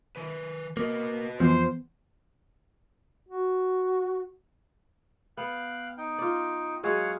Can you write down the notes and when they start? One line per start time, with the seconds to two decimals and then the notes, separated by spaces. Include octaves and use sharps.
0.16 D#3 B4
0.77 A#3 F#4 B4 D#5
1.40 F2 E3 F3 B3 C5
3.29 F#4
5.37 B3 F5 G5 F#6
5.97 D#4 G5
6.19 F4 D5
6.83 F#3 G#3 G#4 C#5 F5 F#5